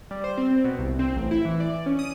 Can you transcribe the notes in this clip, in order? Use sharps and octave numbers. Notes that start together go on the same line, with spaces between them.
G3
C5
C4
B2
C2
C4
A1
E4
E3
D5
C#4
D#6